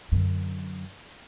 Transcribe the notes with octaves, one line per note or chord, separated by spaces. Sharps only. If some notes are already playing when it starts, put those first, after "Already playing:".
F#2 D3